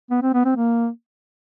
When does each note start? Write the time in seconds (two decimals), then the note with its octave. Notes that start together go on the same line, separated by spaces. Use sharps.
0.10 B3
0.22 C4
0.33 B3
0.45 C4
0.56 A#3